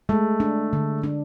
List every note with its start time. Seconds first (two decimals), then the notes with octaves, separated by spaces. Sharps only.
0.09 G#3 A3
0.40 D4
0.73 D3
1.03 D4